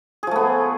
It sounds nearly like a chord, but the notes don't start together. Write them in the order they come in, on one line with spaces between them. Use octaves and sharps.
G#4 F3 A3 B3